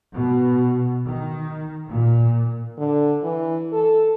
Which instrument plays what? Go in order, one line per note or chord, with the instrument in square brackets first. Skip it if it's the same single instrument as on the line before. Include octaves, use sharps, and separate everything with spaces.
[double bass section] B2
D#3
A#2
[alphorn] D3
E3
A4